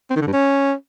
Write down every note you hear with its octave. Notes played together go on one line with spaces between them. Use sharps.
C4
D#3
D3
G2
C#4